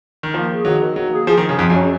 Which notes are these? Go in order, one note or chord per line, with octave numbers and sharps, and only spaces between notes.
D#3
F3 A#3
G#4
D#3 F#3
D#3
F#3 A#3
G#4
F3 G#4
D#3
G#4
C#3
F2 F3
F#2
C#4